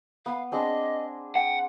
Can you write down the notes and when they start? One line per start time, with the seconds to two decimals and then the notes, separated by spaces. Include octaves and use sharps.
0.26 B3 F5
0.52 C4 D4 G#4 D#5
1.36 F#5 G5